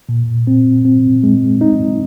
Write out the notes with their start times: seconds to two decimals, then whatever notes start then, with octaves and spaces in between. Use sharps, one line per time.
0.09 A#2
0.47 C4
0.85 C4
1.24 G#3
1.61 D#4